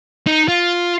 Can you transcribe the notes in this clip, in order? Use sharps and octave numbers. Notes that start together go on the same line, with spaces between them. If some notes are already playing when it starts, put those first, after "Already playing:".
D#4
F4